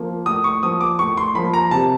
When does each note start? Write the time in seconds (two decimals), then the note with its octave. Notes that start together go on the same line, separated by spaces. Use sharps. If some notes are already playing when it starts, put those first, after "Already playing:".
Already playing: F3 A#3
0.26 A2 D#6
0.44 C#6
0.63 F3 A#3 D#6
0.81 D6
0.99 A2 C#6
1.17 C6
1.35 F3 A#3 B5
1.54 A#5
1.71 C3 A5